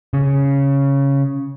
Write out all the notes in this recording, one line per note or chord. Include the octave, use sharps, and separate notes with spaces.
C#3